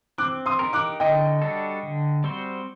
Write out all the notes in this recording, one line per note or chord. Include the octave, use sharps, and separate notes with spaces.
C4 D6 F#6
C6 D#6
D#4 G4 A#4
D6 F#6
D3 D#5 G5
G3 D4 F#4 A4
D3
G3 C4 F#4 C5